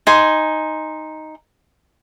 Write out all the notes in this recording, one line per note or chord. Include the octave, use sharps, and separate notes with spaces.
D#4 G#5 C6